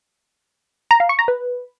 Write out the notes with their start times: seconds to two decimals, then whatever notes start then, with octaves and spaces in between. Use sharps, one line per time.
0.91 A#5
1.00 F5
1.09 C#6
1.19 A#5
1.28 B4